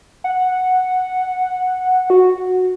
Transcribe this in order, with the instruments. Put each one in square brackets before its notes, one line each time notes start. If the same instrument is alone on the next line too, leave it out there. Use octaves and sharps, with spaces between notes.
[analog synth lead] F#5
F#4